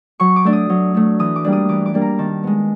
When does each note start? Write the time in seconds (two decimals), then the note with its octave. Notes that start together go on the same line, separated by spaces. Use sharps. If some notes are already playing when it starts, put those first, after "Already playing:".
0.20 F#3 C#6
0.36 D6
0.45 A3 D4
0.53 D#6
0.70 F#3
0.94 A3 D4
1.19 E3 D#6
1.36 D6
1.44 G3 A#3 D4
1.52 D#6
1.69 E3 D6
1.86 D6
1.94 G3 A#3 D4
2.02 A#5
2.18 D#3 A5
2.43 G#3 B3